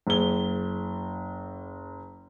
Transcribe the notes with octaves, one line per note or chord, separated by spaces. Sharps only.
F#1 G7